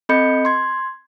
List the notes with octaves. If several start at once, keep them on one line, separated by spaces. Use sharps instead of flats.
C4 A4 D#5 B5 G6 C#7
C6 G#6